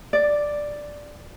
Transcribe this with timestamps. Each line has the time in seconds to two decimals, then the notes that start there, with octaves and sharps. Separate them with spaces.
0.13 D5